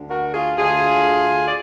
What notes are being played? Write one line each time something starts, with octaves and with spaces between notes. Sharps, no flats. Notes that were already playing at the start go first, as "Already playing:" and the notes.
Already playing: D2 D3
F#4 A#4
F4 G#4
D2 D3 F4 G#4
D5